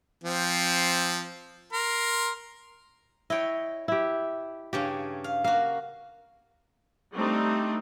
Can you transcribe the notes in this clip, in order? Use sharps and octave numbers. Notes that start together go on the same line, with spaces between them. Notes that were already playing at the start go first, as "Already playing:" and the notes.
F3 C4
A#4 C6
E4 C#5 D#5 G5
E4 G4
G2 C#3 C#4 G4
F5
A#3 F#4 F5
G3 A3 C4 D4 D#4